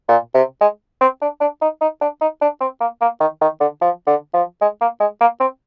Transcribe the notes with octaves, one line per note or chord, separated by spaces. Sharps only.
A#2
C3
G#3
C4
D4
D4
D#4
D#4
D4
D#4
D4
C4
A#3
A#3
D#3
D#3
D3
F3
D3
F3
G#3
A#3
G#3
A#3
C4